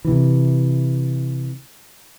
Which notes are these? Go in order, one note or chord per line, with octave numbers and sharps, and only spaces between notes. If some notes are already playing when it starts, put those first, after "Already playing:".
C3 E3